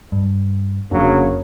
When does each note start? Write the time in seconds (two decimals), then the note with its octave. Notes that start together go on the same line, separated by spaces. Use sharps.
0.12 G2
0.92 F1 C#3 F#3 A#3 D4